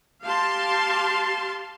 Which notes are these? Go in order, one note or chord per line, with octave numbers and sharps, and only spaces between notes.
G4 F5 A5 C6